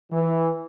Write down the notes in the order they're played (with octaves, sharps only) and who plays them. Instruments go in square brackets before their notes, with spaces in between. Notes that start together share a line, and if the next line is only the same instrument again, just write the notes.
[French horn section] E3